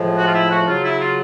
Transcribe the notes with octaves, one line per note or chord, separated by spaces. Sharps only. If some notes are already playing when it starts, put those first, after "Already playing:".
Already playing: A2 F3 G#3
F#4
F4
E4
F#4
C#3 F#3 F4
E4
F4